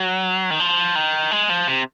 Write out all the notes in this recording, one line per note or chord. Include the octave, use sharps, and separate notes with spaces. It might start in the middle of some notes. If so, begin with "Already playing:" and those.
Already playing: F#3
D#3
F3
D#3
G#3
F3
C3